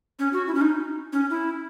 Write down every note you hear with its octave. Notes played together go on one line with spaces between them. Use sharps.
C#4
F#4
E4
C#4
D#4
C#4
E4